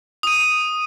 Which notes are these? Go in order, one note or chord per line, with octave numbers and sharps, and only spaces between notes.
D#6 D#7